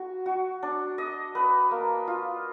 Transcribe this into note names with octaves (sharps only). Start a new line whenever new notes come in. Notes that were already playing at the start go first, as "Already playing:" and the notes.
Already playing: F#4
F#4
D4
D#5
B4
A#3
F4